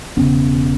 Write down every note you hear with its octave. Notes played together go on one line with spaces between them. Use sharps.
E1 D#2 C#3 B3 C#4